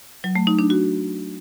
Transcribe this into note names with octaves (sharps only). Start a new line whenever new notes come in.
F#3
A3
D#4
D4
F#4